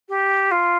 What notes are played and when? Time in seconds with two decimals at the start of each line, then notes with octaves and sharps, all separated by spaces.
0.08 G4
0.51 F4